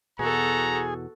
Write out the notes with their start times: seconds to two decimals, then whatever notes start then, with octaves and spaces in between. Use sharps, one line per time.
0.19 E2 B2 F#4 G#4 A4 A#5